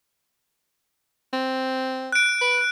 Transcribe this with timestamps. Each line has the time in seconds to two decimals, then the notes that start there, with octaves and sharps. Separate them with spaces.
1.33 C4
2.12 F#6 D7
2.41 B4